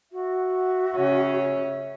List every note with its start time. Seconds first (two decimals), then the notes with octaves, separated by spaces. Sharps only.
0.12 F#4 E5
0.96 C#3 C#4